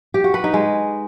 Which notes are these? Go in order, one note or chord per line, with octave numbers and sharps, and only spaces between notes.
G4
F#4
B4
D#4
G#3